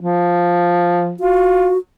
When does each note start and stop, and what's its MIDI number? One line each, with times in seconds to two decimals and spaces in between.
0.01 1.14 53
1.20 1.72 65
1.20 1.78 66